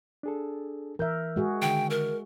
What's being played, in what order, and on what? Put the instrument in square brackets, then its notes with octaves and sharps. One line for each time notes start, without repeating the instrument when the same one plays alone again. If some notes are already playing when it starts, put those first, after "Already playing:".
[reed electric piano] D4 G#4 A4
[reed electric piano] E3 G6 [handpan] A#4 E5
[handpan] G#3 F#4 G#4
[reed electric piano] D3 D#3 [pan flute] G5
[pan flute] A#4